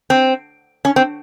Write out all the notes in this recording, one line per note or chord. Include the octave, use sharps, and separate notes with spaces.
C4
C#4
C4